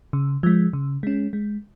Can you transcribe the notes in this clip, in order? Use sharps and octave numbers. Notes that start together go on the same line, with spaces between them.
C#3
F3 G#3
C#3
G#3 C#4
G#3